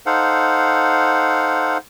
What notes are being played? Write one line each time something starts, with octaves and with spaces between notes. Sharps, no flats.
D#4 A4 C5 F5 F#5